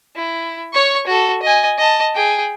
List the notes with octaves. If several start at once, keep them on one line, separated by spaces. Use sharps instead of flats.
E4
C#5 C#6
F#4 A4
D#5 G#5
D#5 A5
G#4 G5